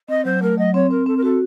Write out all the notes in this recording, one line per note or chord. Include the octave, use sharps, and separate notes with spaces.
C4 D#5
F#3 C5
A3 A#4
F#3 D#5
C4 C#5
C4 A#4
C4 A4
A#4
F#4 A4